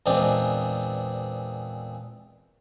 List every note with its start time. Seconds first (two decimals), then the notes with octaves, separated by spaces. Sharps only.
0.06 E2 A#2 G#3 C4 D4